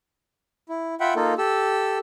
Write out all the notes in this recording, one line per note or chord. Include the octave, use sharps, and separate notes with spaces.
E4
F4 E5 F#5 G5 B5
A#3 D#4 F4 A4
G4 A4 E6